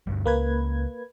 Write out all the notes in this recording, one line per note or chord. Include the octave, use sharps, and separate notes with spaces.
D2 G2 G3
C#2 A#3 B4 G#6